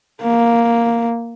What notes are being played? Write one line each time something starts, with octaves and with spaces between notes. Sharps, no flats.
A#3